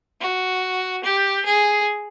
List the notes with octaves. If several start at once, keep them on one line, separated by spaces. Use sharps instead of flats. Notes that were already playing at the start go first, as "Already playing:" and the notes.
F#4
G4
G#4